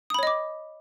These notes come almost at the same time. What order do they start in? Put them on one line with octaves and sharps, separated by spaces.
D#6 B5 C#5 D#5 D6